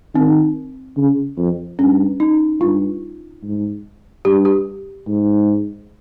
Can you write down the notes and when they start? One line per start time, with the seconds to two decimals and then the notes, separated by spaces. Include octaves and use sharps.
0.15 D#3 C4
0.97 C#3
1.38 F2
1.79 G2 C#4
2.20 D#4
2.61 G2 F4
3.43 G#2
4.25 G2 G4
4.45 G4
5.08 G#2